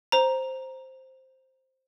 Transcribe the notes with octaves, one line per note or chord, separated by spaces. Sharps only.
C5 A#5